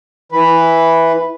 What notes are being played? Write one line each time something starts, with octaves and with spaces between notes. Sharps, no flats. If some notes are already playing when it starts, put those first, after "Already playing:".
E3 B4